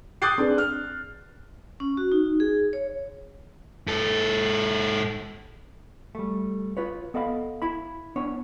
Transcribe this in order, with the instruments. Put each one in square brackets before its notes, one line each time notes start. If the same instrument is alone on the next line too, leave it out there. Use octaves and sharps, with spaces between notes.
[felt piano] D6 D#6 F#6 G6 A6 C7
C4 D4 G#4 B4
F6
[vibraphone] C#4
F#4
D#4
G#4
C#5
[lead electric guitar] G#2 A4
[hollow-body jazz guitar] G3 A3
F4 B4 C#5
B3 A4 D#5 F5 B5
E4 B5
B3 D4 C#5